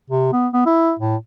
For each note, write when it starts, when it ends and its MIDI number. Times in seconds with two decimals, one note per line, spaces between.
0.10 0.31 48
0.32 0.47 59
0.53 0.64 59
0.66 0.93 64
0.99 1.16 45